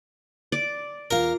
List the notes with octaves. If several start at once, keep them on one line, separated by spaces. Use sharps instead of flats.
D5
E2 F4 A#4 F5